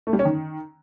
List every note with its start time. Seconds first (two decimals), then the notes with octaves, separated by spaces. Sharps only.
0.07 A3
0.13 G3
0.19 C#4
0.25 D#3